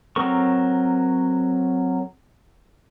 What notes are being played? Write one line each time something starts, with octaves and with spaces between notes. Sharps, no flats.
F#3 C4 A4 A#4 C#6